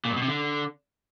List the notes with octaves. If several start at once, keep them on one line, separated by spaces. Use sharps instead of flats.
A#2
G2
B2
C3
D3